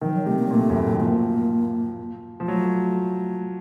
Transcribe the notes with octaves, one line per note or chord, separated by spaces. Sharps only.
D#3 F3
F#3
C3 A3
A#3
F#3
A#2 A3
F#2
A2
D#3
F3 A#3
F3
F#3 A3